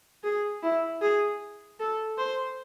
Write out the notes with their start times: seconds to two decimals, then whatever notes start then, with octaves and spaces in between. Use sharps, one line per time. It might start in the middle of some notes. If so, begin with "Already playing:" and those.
0.24 G#4
0.63 E4
1.02 G#4
1.80 A4
2.18 C5